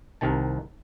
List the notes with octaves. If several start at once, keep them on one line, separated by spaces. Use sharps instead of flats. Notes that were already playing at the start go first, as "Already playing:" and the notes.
C2 C3 D#3 A5